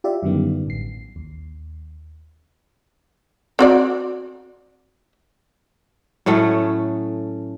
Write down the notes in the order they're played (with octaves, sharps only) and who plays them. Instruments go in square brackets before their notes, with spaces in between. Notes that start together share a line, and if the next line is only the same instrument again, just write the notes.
[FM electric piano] F4 G4 D5 E5
F#2 D3 D#3 G3 B3
A1 C7
D#2
[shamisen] C4 F#4 D5
[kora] A2 F#3 A3 C#4